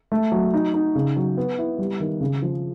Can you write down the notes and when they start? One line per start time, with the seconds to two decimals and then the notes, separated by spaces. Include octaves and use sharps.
0.12 A3
0.32 F#3
0.54 D#4
0.74 D#4
0.95 C#3
1.16 F#3
1.37 B3
1.58 E4
1.78 G3
2.00 D#3
2.21 C#3
2.42 F3